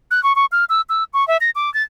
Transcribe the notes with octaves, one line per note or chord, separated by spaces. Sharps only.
F#6
C#6
C#6
F6
E6
E6
C#6
E5
A#6
D6
A6